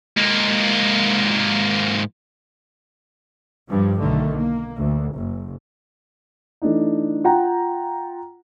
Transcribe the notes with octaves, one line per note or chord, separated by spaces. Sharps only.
G#2 A#3
G2 F3 G3
B1 D3 D#3 A3
A#3
D2
F#1
E3 A3 D4 D#4
F4 F#5 G5 A#5